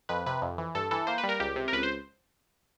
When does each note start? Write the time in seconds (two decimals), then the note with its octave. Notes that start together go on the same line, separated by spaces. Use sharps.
0.09 F2 B4
0.26 C3 B4
0.42 F2
0.58 E3
0.75 G2 A4
0.91 E3 A4
1.07 A#3 C5
1.18 B4
1.24 G3
1.29 A#4
1.40 C#2 G4
1.56 C3
1.68 A#4
1.73 C#2 B4
1.83 C5